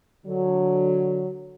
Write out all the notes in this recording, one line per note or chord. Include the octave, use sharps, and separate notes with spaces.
D3 F#3